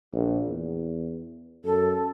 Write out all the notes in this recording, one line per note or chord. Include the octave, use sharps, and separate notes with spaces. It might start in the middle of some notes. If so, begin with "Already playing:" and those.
A#1
E2
F#2 A4